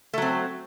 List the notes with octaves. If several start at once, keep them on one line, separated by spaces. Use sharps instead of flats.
F#3 A3 C4